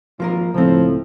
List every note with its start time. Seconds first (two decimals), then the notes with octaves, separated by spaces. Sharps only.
0.20 G#1 F3 A#3 A#4
0.54 C#2 A2 F3 C4